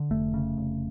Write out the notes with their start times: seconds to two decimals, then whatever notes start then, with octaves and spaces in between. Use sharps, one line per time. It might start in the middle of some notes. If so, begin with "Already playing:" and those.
Already playing: D3
0.11 F1 A3
0.34 C#3
0.58 F1